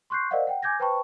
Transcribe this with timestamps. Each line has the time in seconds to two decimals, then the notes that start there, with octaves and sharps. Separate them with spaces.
0.10 C6 C#6 F#6 G6 C7
0.31 A#4 C5 D5 D#5 F5 F#5
0.47 F#5 G5
0.63 G#5 D6 G6 G#6 A#6
0.79 B4 C5 G5 A5 B5 C#6